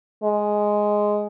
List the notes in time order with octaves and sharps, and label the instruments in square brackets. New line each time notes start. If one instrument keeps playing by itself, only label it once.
[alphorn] G#3